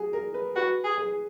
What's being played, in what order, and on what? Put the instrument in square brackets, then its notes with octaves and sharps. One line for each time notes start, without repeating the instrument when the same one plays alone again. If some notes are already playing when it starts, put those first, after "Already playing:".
Already playing: [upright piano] F#4 G#4
A#4
B4
[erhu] F#4 [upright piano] B4
[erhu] G#4
[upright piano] G#4